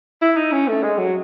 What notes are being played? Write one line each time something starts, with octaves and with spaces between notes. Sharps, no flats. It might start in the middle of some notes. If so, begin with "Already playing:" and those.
E4
D#4
C#4
A3
G#3
F#3